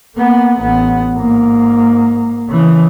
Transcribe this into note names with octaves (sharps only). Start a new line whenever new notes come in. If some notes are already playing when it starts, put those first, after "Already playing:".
A#3 B3
A1 B3
G#2 A#3
C#3 E3